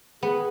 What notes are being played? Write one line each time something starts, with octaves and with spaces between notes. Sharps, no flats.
B3 G#4